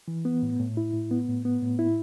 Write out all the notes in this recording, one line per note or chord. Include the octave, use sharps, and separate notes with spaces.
E3
B3
A2
A2
E4
A2
B3
A2
B3
A2
E4